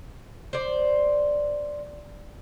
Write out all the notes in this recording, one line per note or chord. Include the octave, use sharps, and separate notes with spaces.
C5 D5